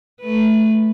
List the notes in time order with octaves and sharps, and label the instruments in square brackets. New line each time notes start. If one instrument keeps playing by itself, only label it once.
[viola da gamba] A3 B4